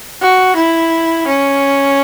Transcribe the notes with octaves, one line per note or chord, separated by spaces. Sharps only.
F#4
E4
C#4